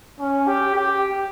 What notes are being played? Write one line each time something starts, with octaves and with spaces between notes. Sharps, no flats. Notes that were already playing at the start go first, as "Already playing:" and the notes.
C#4
G4
G4